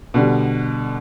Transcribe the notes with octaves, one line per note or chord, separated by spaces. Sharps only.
B2 D3 G3